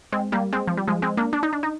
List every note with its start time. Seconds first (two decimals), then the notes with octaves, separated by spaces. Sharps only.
0.12 G#3 C4
0.32 G3 A#3
0.53 G#3 C4
0.67 F3
0.77 G3
0.88 F3 G#3
1.02 G#3 C4
1.17 A#3 D4
1.33 D4
1.43 D#4
1.53 D4
1.63 D#4